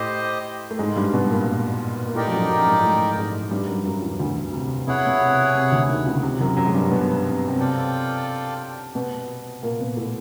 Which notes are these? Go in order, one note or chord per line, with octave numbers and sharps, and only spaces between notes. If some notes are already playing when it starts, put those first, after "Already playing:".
Already playing: A2 A3 G4 C5 D#5
A3
G#2 G#3
G2 G3
B2 B3
A#2 A#3
A#3
A2 A3 D#4 G4 A#4 D5 G5
F3
F#2 F#3
F#2 F#3
G#2 G#3
G#3
A2 A3
G#2 G#3
G2 G3
F#2 F#3
F#2 F#3
E2 E3
D2 D3
C3
B2 E4 G#4 C#5 F#5
B2
C3
C3
D2 D3
D#2 D#3
C#2 C#3
C3
F#2 F#3
F#2 F#3
G#3
G2 G3
B2 B3
C4
C3 C4
F4 A4 D5 G5
B2 B3
A#2 A#3
B2 B3
A2 A3